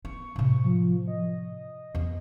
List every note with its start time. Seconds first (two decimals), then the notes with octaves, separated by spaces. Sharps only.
0.05 B3 C#6
0.36 A2 C3
0.64 F3
1.08 D#5
1.95 E2 B3